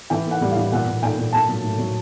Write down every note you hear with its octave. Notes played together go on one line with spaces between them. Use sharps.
E3 G5
A#3
F#5
G3
F5
E3
A#2 F#5
A#2
A#2 G5
A#2
A#3 A5
F#3
A2
F#3